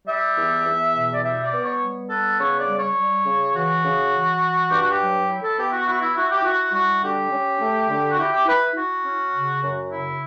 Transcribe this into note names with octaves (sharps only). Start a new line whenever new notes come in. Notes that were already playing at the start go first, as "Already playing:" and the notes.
G3 E5
E2
E2
B2
D5
G3 E5
D5
B3
C#5
G3
B3 A4
C#3 C#5
D5
G3
C#5
G3
C#3
E3 F#4
C#3
E3
E3
G2 G4
F#4
G4
F#3
E4
A4
B3 G4
F#4
E4 F#4
E4
E4 F#4
G4
E4 F#4
G3 F#4
D3 G4
C#4
A3
D3
F#4
E4 G4
G4
E4 B4
E4 F#4
C#4
C#3
F#2
C#3 E4